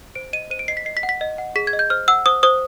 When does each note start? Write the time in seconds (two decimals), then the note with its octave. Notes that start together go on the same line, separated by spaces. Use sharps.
0.15 C5 D7
0.33 D#5 D#7
0.50 C5 D#7
0.59 D7
0.68 D#5 C7
0.77 B6
0.85 D#5 C7
0.97 B6
1.03 F#5
1.09 B6
1.21 D#5
1.38 F#5
1.56 G#4 B6
1.67 G#6
1.73 D#5
1.79 G6
1.90 C5 F6
2.08 F#5 E6
2.26 C5 D#6
2.43 C5 D#6